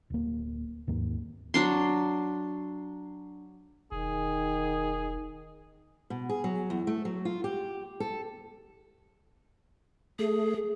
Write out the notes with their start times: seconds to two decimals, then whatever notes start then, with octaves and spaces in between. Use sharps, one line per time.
0.10 D1 A#3
0.87 D#2 G#2 A#3
1.54 F#3 D4 C6
3.92 E1 D#3 G#4
6.10 B2
6.29 G#4
6.44 F#3
6.70 E2
6.87 A3
7.05 F#3
7.25 F4
7.44 G4
8.00 A4
10.19 A3 G#4